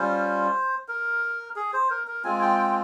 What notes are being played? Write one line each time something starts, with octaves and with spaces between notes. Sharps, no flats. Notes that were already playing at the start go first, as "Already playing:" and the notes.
Already playing: G3 C#4 F4 C5
A#4
G#4
C5
A#4
A#4
G#3 C4 F4 G#5
G5
G5